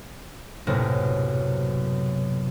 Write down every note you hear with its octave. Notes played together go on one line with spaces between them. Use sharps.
B1 F#2 A2 C3 A#3